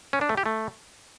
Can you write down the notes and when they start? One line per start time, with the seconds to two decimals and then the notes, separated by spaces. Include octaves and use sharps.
0.13 C#4
0.21 D4
0.29 A3
0.37 G4
0.46 A3